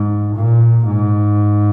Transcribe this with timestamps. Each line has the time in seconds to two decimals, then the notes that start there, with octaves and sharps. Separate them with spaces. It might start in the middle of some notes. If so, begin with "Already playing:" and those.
Already playing: G#2
0.36 A#2
0.90 G#2